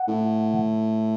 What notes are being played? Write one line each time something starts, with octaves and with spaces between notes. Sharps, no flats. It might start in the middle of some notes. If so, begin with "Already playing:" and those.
Already playing: F#5
A2